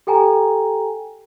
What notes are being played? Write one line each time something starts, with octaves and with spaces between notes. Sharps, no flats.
G4 A4 G5 G#5 A#5